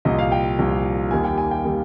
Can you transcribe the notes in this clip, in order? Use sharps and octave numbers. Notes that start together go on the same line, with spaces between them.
C2 A#2 F3 D#5
F5
G5
C2 A#2 F3
D#2 D#3 G3 A#3 G#5
G5
G#5
G5
D#3 G3 A#3